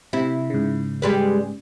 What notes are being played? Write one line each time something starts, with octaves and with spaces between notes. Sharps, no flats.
C3 E4
G#2 C#3
G3 G#3 B4